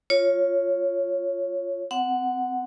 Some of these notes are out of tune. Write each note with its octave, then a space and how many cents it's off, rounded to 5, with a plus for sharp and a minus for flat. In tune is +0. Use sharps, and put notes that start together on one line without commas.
F4 +0 C#5 +0
C4 -30 F#5 +0